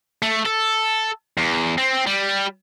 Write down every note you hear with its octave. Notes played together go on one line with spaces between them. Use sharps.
A3
A4
E2
C4
G3